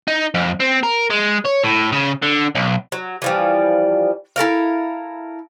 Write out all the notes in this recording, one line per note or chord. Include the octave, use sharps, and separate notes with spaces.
D#4
F2
C4
A#4
G#3
C#5
A2
C#3
D3
B1
F#3
E3 F3 G3
E4 A4 A#4 F5